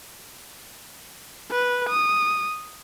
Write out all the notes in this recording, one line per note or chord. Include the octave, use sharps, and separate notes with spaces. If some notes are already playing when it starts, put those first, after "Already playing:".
B4
D#6